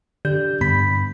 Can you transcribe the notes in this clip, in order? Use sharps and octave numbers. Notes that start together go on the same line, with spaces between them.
D3 G4 D5 G6
G2 B3 B5 B6